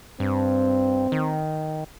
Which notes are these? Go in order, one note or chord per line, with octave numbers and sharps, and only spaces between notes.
G2 C4
D#3